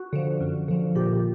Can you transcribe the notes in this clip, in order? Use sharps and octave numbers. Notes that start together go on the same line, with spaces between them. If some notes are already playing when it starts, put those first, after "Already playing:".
Already playing: F#4
D3 F3
F#2
D3 F3
A#2 G4